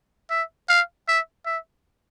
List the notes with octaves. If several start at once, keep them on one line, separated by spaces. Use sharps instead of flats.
E5
F5
E5
E5